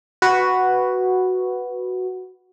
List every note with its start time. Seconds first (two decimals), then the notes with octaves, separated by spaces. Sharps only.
0.22 F#4 B4